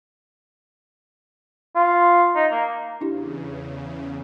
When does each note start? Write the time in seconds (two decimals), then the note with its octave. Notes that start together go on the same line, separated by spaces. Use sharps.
1.76 F4
2.36 D#4
2.52 A#3
3.01 E2 C#3 D4 E4 G4